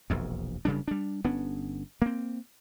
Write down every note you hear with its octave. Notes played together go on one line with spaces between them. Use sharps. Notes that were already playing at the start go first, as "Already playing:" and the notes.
E1 A#1 F2
F#1 C#3 G3 D4
G3 D4
G1 B3 C#4 D4
A#3 C4